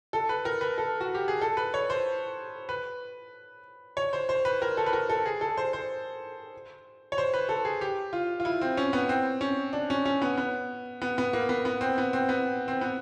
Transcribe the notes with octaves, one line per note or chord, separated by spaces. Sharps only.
A4
B4
A#4
B4
A4
F#4
G4
G#4
A4
B4
C#5
C5
B4
C#5
C5
C5
B4
A#4
A4
B4
A#4
A4
G#4
A4
C5
C5
C#5
C5
B4
A4
G#4
G4
F4
F4
E4
C4
C#4
B3
C4
C#4
D4
C#4
C#4
B3
B3
B3
B3
A#3
B3
B3
C4
B3
C4
B3
C4
B3